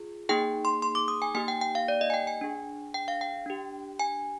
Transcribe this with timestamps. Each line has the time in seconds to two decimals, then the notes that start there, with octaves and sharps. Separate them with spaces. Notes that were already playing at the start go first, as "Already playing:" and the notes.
Already playing: F4 G#4
0.29 A#3 D#4 G#4 G5
0.65 C6
0.82 C6
0.95 D6
1.08 D#6
1.22 G#5
1.35 A#3 D#4 G4 G#5
1.48 G5
1.61 G5
1.75 F5
1.88 D5
2.01 D#5
2.10 G#5
2.14 G5
2.27 G#5
2.41 D4 G#4
2.94 G5
3.08 F5
3.21 G5
3.46 D4 G4
3.99 G#5